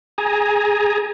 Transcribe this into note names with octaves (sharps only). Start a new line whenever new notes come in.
G#4 G#5 A#5